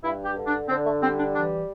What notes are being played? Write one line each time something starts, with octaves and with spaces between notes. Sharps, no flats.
G2 E4
G4
D3
D4
D3 C4
A3
G3 C4
D4
E3 D4